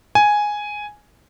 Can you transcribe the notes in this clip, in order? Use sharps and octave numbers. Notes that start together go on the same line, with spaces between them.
G#5